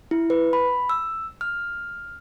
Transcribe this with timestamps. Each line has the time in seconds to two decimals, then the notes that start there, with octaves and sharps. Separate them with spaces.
0.11 E4
0.30 B4
0.53 B5
0.89 E6
1.41 F6